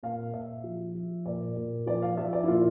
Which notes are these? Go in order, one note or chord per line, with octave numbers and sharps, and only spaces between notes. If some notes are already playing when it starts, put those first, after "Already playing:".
A#2 F5
A#2 E5
F3
F3
A#2 D5
A#2
F3 D5
F5
F3 E5
D5
E4
A#2 F4